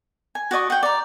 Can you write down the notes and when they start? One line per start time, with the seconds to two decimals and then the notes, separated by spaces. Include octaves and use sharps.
0.35 G#5
0.51 F#4 D5 D#5 C#6
0.70 F#5 G5
0.83 D5 A#5